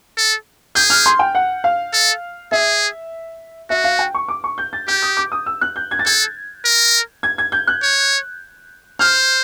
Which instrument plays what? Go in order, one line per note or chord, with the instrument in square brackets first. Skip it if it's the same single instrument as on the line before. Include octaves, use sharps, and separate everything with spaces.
[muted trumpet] A4
[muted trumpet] G#4 [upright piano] G6
[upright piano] F6
C6
G5
F#5
F5
[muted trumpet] A4
[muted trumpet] G#4 [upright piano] E5
[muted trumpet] F#4 [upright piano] E5
[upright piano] F5
G5
C#6
D6
C#6
G6
A6
[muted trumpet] G4 [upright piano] G6
[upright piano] D#6
D6
D#6
E6
F#6
G6
G#6
A6
[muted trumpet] A4 [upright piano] G#6
[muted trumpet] A#4
[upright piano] G#6
G#6
G6
F#6
[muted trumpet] C#5
[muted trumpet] C5 [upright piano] F6